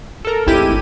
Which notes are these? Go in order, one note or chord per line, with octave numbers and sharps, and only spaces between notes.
A4 A#4
G#1 D2 E4 G4 D#7